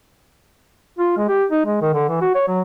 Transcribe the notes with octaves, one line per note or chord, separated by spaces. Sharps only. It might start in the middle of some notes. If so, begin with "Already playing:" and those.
F4
G#3
G4
D#4
G#3
D#3
D3
E3
F#4
C#5
F#3